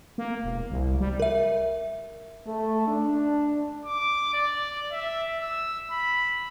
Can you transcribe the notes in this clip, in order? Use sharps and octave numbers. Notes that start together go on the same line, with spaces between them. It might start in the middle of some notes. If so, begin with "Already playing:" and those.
A#3
E1
C2
G3
A#4 E5
A3
D4
D6
D5
E5
E6
B5